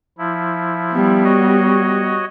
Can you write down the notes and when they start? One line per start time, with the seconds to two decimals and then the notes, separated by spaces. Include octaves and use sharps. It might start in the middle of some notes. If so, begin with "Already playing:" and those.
0.18 F3 E4
0.91 G3 B3
1.24 F#4 C#5 D#5